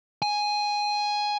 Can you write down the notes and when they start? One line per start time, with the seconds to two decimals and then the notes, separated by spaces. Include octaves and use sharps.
0.22 G#5